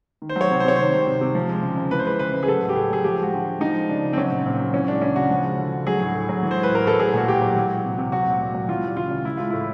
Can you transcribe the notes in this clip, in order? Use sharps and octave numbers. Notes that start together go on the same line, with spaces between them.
D#3
C5
F#3 C#5
C3
C5
C3 C#5
D#3 C5
G3
C3
C3
F3
G#3
C#3
C#3
E3 B4
C5
G#3 B4
C#3 B4
C#3
G#4
F#3 A4
A2
G4
A2 G#4
F#3 G#4
F3 G4
G#3 F#4
D3
D3
F3 D#4
G#3
C#3 D4
C#3
C4
F#3 C#4
A#2
A#2 C4
F#3
E3 C#4
G#3 D4
C#3 C#4
C#3 F#4
F3
G#3
D3
D3
F#3 G#4
A2
A2
F#3
E3
C5
G#3
B4
A2 A#4
A2 A4
F#3 G#4
A#2 F#4
A#2 G4
F#3
E3
G#3
C3
C3
F#3 F#4
A#2
A#2
F#3
E3 F4
G3
C#3 F4
C#3
E3 E4
G#3 F4
A2 E4